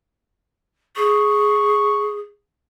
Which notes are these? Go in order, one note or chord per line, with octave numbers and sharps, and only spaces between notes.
G#4 C#6